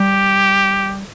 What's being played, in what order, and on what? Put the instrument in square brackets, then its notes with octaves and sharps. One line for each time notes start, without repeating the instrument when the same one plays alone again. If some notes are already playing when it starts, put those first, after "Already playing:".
Already playing: [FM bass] G3 [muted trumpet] G4